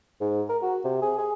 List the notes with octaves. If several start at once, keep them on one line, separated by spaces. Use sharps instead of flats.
G#2
A#4
F#4
C3
G#4
G#4